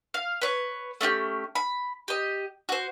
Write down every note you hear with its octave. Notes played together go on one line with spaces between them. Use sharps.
F5
B4 C#5
A3 C#4 F#4 G4
B5
G4 D#5
F#4 C5